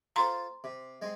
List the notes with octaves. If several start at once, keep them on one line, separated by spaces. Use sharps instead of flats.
F4 A4 C5 A#5 C6
C3
G#3 C4